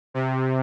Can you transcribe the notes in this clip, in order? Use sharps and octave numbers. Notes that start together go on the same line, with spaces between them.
C3